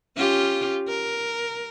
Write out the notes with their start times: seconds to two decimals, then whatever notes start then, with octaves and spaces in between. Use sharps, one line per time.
0.17 C#4 F4 G4
0.88 A#4